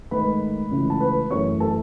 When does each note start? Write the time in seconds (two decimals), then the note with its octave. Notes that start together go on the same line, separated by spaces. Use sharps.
0.11 G#2 D#3 A3 B4 B5
0.71 C#2 C#3 E3 A3
0.90 A5
1.00 B4 B5
1.31 F#2 E3 A3 C#5 C#6
1.60 A4 A5